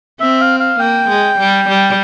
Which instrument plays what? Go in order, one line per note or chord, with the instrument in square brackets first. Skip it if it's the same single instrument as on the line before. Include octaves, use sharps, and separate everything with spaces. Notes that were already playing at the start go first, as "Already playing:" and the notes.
[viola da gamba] C4 [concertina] E5
[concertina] F5
F5
[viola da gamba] A#3 [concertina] G5
[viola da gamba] G#3
G3
G3